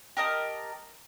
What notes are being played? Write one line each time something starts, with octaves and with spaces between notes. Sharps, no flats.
G4 A#4 D#5 A5